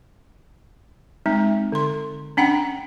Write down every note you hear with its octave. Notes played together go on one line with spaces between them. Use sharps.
G#3 C4 D#4
D3 C6
C#4 D4 F#5 G5 B5